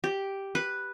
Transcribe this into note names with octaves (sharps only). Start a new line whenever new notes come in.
G4
B4